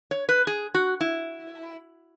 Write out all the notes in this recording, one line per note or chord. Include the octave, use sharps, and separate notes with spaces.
C#5
B4
G#4
F#4
E4